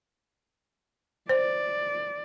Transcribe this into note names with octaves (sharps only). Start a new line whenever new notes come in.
C5 D5